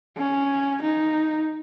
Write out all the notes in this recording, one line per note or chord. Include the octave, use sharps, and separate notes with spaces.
C#4
D#4